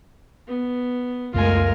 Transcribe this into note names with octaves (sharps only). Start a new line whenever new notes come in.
B3
C#2 F#2 G#3 A3 B3 F4 A#4 G#5